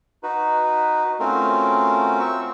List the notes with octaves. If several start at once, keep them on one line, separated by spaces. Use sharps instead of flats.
D#4 F#4 B4
A3 C4 C#4 F4 F#4 A#4
C4 C#6 E6